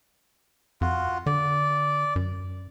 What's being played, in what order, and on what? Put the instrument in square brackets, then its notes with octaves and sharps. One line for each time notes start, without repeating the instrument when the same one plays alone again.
[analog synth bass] F2 [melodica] F4 F#4
[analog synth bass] D3 [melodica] D5
[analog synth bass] F#2